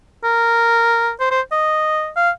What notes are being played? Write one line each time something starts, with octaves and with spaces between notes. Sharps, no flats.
A#4
C5
C5
D#5
F5